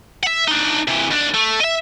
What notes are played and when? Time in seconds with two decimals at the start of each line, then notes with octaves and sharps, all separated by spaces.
0.23 E5 F#5
0.48 D4 D#4
0.88 C3 E3
1.11 D#2 D4
1.34 A3
1.60 D#5 E5